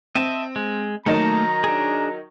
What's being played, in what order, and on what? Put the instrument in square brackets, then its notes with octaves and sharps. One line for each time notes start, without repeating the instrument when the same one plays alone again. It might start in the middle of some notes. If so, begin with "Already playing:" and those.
[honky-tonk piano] C4 [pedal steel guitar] D#5 E5 A5
[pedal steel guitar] G#3
[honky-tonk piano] D#3 F#3 D#4 [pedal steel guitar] A3 A#3 A5 [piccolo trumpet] A#5
[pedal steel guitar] D4 G#4